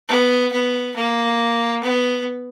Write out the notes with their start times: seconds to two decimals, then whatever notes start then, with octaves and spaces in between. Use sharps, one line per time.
0.08 B3
0.52 B3
0.96 A#3
1.84 B3